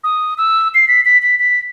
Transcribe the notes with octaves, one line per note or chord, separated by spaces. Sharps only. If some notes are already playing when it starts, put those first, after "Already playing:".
D#6
E6
C7
B6
B6
B6
B6